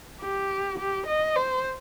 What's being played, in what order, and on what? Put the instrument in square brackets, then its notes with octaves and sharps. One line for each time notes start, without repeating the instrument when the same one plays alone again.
[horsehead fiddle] G4
G4
D#5
C5